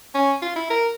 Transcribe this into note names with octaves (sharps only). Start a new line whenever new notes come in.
C#4
F4
E4
A#4